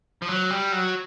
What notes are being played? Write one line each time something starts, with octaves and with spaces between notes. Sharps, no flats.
F3
F#3
G3
F#3